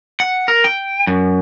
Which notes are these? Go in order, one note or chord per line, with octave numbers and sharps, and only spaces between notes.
F#5
A#4
G5
F#2